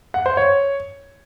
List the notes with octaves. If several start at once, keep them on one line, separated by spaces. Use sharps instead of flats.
F#5
C5
C#5